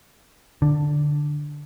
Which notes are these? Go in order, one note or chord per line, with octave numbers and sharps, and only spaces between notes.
D3